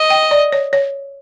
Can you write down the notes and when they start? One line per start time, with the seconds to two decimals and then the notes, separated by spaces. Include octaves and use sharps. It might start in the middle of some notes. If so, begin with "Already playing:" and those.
Already playing: D#5
0.10 G5
0.31 D5
0.52 C#5
0.73 C#5